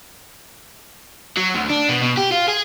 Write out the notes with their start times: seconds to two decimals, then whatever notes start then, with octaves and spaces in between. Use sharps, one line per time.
1.37 F#3
1.55 D2
1.70 D4
1.89 B2
2.02 B2
2.17 G4
2.32 F4
2.48 G#4